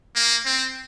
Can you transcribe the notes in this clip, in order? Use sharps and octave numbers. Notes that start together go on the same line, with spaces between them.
A#3
C4